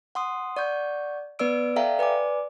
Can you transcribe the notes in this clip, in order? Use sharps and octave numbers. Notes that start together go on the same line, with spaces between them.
F#5 C6 D#6
D5 F#5 C#6 G6
B3 B4 D5 E6 D7
A4 D5 E5 F5 G5 A#5
B4 D5 G#5 D6